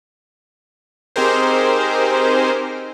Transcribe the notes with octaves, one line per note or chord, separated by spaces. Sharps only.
C4 D#4 G4 G#4 A#4 C5